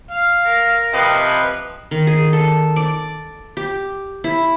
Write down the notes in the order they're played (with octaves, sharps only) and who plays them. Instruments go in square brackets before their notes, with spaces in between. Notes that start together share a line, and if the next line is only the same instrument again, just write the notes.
[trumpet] F5
[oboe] A#4
[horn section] C3 F3 B4 [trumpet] D#5
[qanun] D#3
G#4
A4
D5
G4
E4